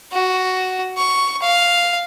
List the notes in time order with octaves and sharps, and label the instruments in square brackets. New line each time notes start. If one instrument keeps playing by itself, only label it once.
[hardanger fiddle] F#4
C#6
F5